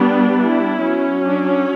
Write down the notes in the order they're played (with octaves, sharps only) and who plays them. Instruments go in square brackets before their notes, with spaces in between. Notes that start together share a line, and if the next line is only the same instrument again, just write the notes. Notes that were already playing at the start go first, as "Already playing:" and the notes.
Already playing: [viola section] G3 B3 D4
E4
F#3 C#4
D4